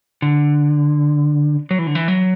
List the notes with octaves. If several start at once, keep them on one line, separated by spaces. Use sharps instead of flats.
D3
F#3
E3
D3
E3
F#3